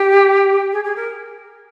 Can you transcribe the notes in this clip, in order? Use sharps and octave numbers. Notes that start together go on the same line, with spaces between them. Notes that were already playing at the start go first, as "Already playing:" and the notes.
Already playing: G4
G#4
G#4
A#4